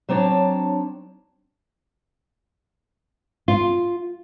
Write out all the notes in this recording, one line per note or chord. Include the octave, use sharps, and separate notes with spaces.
F#3 C4 D4 C#5 A5
F4